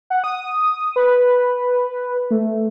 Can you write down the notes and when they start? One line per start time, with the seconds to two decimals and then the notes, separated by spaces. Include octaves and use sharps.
0.10 F#5
0.24 D#6
0.96 B4
2.31 A3